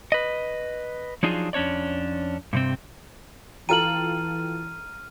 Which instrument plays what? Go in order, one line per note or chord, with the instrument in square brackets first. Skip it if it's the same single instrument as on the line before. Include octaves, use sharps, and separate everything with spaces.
[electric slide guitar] B4 D#5
F3 F#3 D4 D#4 F4 G#4
F2 C#4 D4 C#5 D5
G2 C3 C4
[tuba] E3 [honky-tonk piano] F4 A4 G5 [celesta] A#5 F#7 [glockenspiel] F6 D#7